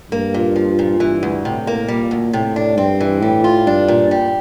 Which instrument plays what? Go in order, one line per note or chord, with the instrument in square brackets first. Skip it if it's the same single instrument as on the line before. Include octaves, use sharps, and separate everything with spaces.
[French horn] G2 [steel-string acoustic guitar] A#3
[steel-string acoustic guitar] A#2
F3
A#2
[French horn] G2 [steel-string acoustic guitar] E3
[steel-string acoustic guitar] D2
[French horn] A2 [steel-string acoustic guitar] C3
[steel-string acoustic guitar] A#3
[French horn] A#2 [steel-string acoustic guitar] G3
[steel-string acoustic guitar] D2
[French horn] A2 [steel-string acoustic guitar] C3
[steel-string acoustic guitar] D4
[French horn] G2 [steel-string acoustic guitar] C4
[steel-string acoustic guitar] E3
[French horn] A2 [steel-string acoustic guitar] G3
[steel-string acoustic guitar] F4
[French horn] G2 [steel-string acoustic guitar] D4
[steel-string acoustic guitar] A#2
G3